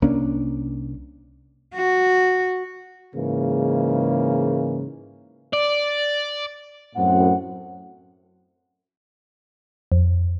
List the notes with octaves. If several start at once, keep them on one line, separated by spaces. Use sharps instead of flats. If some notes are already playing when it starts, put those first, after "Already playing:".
C2 A#3 C#4 D4
F#4
G#2 C#3 E3 G#3 A#3
D5
F#2 A2 C4 F#5
F2